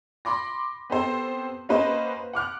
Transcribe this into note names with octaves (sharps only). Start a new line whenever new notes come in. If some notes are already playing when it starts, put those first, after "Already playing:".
B5 C6 D6 A#6
B3 C4 G4 A4 C5
A#3 C#4 F#4 B4 C5 D#5
F#5 D6 F6 F#6